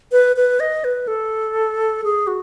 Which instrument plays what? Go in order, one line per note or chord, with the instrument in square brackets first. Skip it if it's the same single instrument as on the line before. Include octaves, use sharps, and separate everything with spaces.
[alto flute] B4
B4
D#5
B4
A4
G#4
F#4